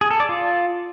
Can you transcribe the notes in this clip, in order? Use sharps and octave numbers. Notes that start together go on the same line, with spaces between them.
G#4
A4
D5
F4